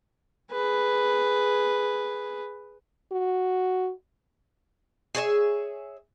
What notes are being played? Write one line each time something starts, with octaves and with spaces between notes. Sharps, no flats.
G#4 B4
F#4
G#4 C#5 D5 E5